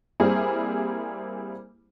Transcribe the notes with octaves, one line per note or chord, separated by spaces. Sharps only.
G3 A#3 C4 E4 G#4